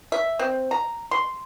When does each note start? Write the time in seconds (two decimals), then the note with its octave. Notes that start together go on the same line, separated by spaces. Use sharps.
0.12 E5
0.39 C4
0.71 A#5
1.11 C6